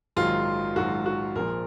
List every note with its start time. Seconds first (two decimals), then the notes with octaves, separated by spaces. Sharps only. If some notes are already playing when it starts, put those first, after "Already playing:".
0.16 A#1 G#2 D#3 F#3 F4
0.76 A#1 G#2 D#3 F#3 F#4
1.06 F#4
1.35 A#1 A#2 F3 A#4